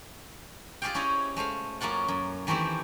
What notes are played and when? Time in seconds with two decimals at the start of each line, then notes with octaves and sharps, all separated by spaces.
0.82 F4 G4 G#4 D5 F5 G5
0.95 C#4 E4 C5 C#5 D#5
1.36 G#3 A3 C5 F5
1.81 F#2 A#3 C#4 F4 F#5
2.08 F#2
2.47 D#3 E3 A3 C4 E4 G4